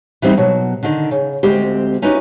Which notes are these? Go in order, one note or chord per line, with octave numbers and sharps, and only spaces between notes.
E3 G3 C4 D4 D#4
B2 F#3
D3 D#3
C#3
D2 G#3 C4 G4
C#4 D#4 E4 F#4 B4